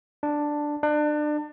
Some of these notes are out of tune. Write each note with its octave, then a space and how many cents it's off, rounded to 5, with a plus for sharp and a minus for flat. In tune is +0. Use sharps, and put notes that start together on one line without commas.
D4 +5
D4 +30